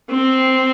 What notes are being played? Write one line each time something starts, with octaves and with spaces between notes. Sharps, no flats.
C4